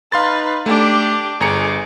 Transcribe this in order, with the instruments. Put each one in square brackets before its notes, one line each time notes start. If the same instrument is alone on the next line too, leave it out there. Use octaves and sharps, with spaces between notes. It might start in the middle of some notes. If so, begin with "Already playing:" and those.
[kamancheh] D#4 B4 [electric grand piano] F5 C6 A6
[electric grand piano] A3 [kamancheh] D4 G4
[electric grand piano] G1 A#5 C#7 [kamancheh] G#4 D6